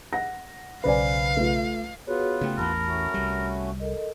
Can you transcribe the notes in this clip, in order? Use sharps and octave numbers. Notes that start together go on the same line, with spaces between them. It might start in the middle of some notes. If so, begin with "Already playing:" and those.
F#5 A#6
B1 C#3 B4 C5 D5 F5 G#5
A3 F4
B3 F4 F#4 G#4 B4 C#5
C#3 A3 G4 G5
A1 E2 G#2 A#4 A5 B5
A3 C#4 F#4
C2 G3
A4 A#4 D#5